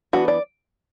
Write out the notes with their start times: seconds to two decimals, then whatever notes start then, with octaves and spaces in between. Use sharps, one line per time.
0.13 E3 B3 D4 F#4
0.28 D5